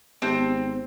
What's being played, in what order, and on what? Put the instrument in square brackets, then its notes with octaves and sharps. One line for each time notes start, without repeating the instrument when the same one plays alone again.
[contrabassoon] G#1 [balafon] B3 G4 A5 [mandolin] C4